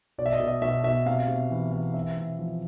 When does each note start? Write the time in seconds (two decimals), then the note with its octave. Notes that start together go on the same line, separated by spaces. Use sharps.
0.18 B2 D5
0.26 E5
0.33 D#5
0.40 B2
0.47 D#5
0.62 B2 E5
0.84 B2 E5
1.06 C3 F5
1.28 C3
1.51 E3
1.72 E3
1.94 C3 E5
2.17 C3
2.39 F3